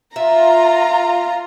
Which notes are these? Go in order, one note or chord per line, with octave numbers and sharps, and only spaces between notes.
F4 E5 A#5